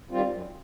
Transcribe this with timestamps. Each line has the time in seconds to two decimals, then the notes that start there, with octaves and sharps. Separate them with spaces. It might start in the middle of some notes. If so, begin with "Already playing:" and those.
0.11 D#3 G3 C4 F4
0.32 F#2